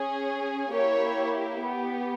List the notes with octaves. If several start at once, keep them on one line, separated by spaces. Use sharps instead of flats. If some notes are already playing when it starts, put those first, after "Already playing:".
Already playing: C#4 G#4
A#3 E4 G4 C#5
B3 G4